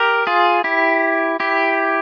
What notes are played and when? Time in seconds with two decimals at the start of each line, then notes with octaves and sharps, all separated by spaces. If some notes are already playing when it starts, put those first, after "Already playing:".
Already playing: G4 A#4
0.27 F4 G#4
0.64 E4 G4
1.40 E4 G4